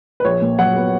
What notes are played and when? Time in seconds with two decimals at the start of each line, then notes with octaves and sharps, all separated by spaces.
0.20 B4
0.25 A#1 C#5
0.42 A#2
0.59 F#3 F#5
0.76 B3